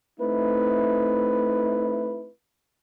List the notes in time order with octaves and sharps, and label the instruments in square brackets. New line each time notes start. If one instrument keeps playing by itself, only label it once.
[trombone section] A3 C4 D#4 E4 B4